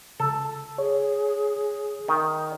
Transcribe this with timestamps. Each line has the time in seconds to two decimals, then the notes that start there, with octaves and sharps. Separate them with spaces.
0.20 C#2 A4
0.78 G#4 C#5
2.08 D#3